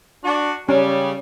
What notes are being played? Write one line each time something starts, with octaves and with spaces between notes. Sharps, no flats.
D4 F#4
C#3 G3 C#4